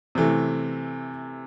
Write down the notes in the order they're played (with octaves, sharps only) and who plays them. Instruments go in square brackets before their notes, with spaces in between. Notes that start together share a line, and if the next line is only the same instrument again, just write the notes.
[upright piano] C3 E3 A3